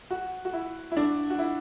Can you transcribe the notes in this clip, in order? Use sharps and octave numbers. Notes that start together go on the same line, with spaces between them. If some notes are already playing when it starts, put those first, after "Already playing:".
F#4
F#4
E4
E4
D4
F#4
E4